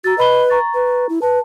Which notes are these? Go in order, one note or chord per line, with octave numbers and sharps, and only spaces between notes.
F#4 A#5 E6 A6
B4 D#5 B5 G7
A#5 C#6 A6
B4
E4
B4 A5